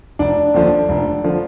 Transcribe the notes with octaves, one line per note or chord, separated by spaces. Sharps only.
F1 D4
D#2 D3 F3
F1
D3 F3